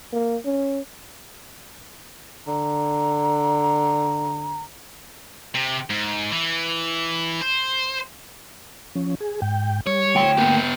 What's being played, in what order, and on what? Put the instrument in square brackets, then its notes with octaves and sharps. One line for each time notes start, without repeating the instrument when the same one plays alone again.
[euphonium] A#3
C#4
[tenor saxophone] D3 [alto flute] A#5
[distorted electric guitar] C3
G#2
E3
C5
[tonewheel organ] F3 C#4
G#4
G#2 G5
[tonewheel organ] G3 [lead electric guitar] C#5
[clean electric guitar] D2 G5 C6
[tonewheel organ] A#3 [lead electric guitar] B3 G4